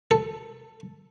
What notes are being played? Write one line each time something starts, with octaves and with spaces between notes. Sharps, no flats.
A4